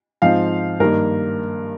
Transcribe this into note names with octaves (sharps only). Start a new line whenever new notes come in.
G#2 F3 C4 D#4 F5
G2 D#3 A#3 D#4 A#4